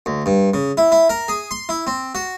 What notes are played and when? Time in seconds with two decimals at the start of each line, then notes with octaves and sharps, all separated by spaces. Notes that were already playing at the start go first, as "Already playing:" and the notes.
0.06 D2
0.26 G2
0.54 C#3
0.77 E4
0.92 E4
1.09 A#4
1.28 G#4
1.51 C6
1.69 E4
1.87 C4
2.15 F#4